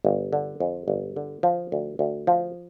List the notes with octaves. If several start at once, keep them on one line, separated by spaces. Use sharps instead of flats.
G1
D3
F2
G1
D3
F3
D2
D2
F3